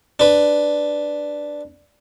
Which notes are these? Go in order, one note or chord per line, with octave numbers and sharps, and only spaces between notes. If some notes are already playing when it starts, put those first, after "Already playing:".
D4 B4